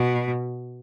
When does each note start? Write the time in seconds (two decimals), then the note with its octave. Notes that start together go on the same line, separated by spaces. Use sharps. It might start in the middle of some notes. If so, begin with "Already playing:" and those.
Already playing: B2